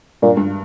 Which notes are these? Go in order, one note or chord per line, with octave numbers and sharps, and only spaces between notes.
G2 A#2
G2